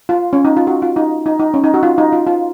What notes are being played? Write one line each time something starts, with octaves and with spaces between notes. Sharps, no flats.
F4
C#4
D#4
F4
F#4
F4
D#4
D#4
D#4
C#4
D#4
F#4
F4
D#4
F4
F4